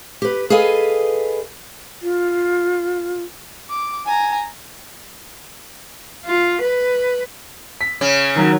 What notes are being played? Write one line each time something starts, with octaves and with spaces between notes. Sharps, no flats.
G4 B4
G#4 A4 B4 D#5 F5 G#5
F4
D6
G#5 A#5
F4
B4
B6
C#3 C#4
D#3 F#3 F#4